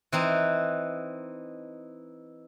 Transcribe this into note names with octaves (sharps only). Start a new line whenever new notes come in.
E3 C4 D#4